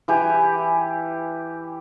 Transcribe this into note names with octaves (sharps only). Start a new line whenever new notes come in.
E3 G4 G#5